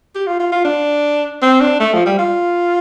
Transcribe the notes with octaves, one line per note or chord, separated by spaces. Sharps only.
G4
F4
F4
F4
D4
C4
D4
A3
F3
G3
F4